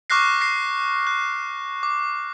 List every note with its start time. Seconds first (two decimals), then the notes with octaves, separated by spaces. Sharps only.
0.10 C#6 D6 F6 F#6 A#6 C7
0.41 A#6 C7
1.07 F#6
1.83 D6